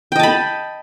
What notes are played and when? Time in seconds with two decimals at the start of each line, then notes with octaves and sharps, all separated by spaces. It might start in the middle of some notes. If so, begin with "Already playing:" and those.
0.12 G5
0.16 D#5
0.19 A5
0.23 B5